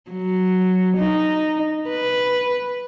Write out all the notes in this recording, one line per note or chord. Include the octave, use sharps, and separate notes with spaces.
F#3
D#4
B4